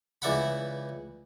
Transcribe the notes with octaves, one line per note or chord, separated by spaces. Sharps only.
C#2 E3 D5 E5 F#5 B5